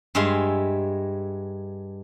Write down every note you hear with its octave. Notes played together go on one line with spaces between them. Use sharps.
G2 G#3 E5 F5 C6